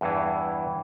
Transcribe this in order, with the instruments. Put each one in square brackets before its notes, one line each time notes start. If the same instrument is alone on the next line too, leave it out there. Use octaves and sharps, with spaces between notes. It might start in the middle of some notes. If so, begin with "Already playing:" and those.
[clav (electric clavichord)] E2 G2 E3